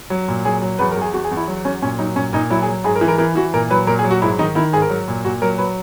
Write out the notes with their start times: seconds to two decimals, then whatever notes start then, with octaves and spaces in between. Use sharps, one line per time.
0.10 F#3
0.28 A#2
0.45 F#3 G#4
0.62 F#3
0.79 E2 B4
0.91 A#4
0.96 E2
1.02 G#4
1.13 E2 F#4
1.24 G#4
1.31 E2
1.37 E4
1.48 F#3
1.65 F#3 C#4
1.82 A#2 C#4
1.99 F#3 D#4
2.16 A#2 C#4
2.33 A#2 D#4
2.50 F#3 E4
2.62 G#4
2.68 F#3
2.84 G#2 G#4
2.96 A#4
3.01 E3
3.08 A#4
3.18 E3 A#4
3.35 E3 F#4
3.53 A#2 A#4
3.70 F#3 B4
3.87 A#2 A#4
3.99 G#4
4.04 F#3
4.10 F#4
4.22 G#2 E4
4.39 D#3 D#4
4.55 D#3 E4
4.73 G#2 G#4
4.82 A#4
4.90 F#3
5.08 A#2
5.24 A#2 F#4
5.42 F#3 A#4
5.58 F#3 B4